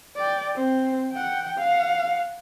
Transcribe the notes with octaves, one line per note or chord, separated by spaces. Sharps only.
D5 G5
C4
F#5 G5
F5 F#5